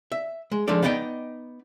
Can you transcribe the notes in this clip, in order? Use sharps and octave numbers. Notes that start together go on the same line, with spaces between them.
E5
G#3
F3 G#3 D4 D#4 A4 D5
B3 D#4 D5 D#5 F#5 G5